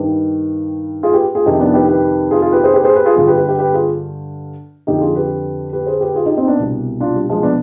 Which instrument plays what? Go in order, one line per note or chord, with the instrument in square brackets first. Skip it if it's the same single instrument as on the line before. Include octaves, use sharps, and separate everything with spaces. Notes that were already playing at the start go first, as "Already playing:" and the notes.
Already playing: [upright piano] G2 D#3 G4 B4
F4 G#4
G4 B4
F4 G#4
F2 C3 D#3 D#4 G4
B3 D4
G4 B4
G4 B4
F4 G#4
F4 G#4
G4 B4
G#4 C5
G4 B4
G#4 C5
G4 B4
F4 G#4
G2 D3 F4 G#4
G4 B4
G4 B4
G4 B4
G4 B4
F4 G#4
F2 D3 D#4 G4
F4 G#4
G4 B4
G4 B4
G#4 C5
G4 B4
F4 G#4
D#4 G4
C4 D#4
B3 D4
C2 B2
D4 F4
G3
F3 G#3
B3 D4